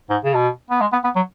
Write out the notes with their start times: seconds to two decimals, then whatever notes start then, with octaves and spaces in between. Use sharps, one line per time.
0.10 G#2
0.24 C#3
0.34 B2
0.71 B3
0.81 G#3
0.93 B3
1.04 B3
1.16 F#3